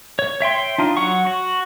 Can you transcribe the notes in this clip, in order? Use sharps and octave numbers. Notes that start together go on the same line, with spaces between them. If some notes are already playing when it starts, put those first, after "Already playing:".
C#5
C#5 E5 G5 C6
D4 D#4 F4
F#3 F#5 C#6
F#4